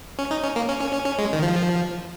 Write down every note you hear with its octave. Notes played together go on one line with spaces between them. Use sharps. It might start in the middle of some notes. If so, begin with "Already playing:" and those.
C#4
D#4
C#4
A#3
C#4
C#4
C#4
C#4
G#3
D#3
F3